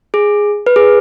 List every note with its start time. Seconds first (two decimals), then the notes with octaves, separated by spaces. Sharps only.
0.14 G#4
0.67 B4
0.76 G#4